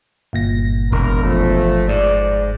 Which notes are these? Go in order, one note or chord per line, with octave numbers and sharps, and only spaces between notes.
G1 A#2 A#6
E1 A#4
F3 A3
G#2 D5